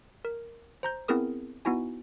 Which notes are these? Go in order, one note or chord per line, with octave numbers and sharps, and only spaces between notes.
A#4
C5 A#5 G6
B3 C4 E4 G#4 A#4 D#6
B3 D#4 E4 F#4 G#5